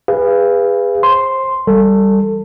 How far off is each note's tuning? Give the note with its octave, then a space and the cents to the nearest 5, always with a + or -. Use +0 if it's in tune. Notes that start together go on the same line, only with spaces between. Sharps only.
G#4 -30 B4 +0 F5 -25
C5 +25 C6 +0
E3 +0 G3 +0 A4 +25